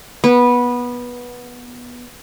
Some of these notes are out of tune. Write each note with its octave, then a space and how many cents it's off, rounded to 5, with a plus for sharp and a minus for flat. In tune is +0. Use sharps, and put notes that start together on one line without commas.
B3 -15